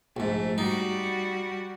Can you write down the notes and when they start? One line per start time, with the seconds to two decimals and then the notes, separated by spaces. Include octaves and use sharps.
0.17 A#1 G#2 A3
0.58 G3 D#4 F#4